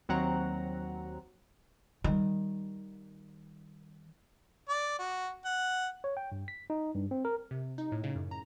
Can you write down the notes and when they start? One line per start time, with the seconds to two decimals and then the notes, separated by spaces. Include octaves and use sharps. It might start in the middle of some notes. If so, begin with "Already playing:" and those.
0.09 D#2 F#3 C4 F#4 F#5 A#5
2.04 D#3 G3
4.69 D5
4.99 F#4
5.45 F#5
6.04 C#5
6.17 G5
6.32 G2
6.48 B6
6.70 D#4
6.94 G2
7.11 C4
7.25 A#4
7.51 C3
7.78 D#4
7.92 A2
8.04 C#3
8.16 F#2
8.31 A#5